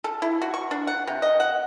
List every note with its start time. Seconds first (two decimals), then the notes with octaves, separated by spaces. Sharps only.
0.04 A4
0.22 E4
0.42 F#4
0.54 C#6
0.71 D4
0.87 F#5
1.07 C3
1.22 D#5
1.40 F#5